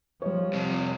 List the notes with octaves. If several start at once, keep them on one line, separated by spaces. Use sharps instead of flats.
F3 G3 C#5
F2 C3